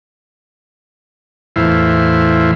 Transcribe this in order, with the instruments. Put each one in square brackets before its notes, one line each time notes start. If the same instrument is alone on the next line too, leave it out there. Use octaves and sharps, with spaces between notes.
[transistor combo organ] E2 A2 E4 F4 C5